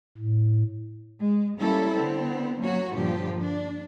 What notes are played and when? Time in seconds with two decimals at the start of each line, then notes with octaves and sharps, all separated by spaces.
0.18 A2
1.20 G#3
1.59 G3 A#3 C#4 E4 A4
1.95 D3 B3 C4
2.60 F#3 A#3 C#4 F#4 C#5
2.94 G2 A#2 D3 F3 G4
3.41 D4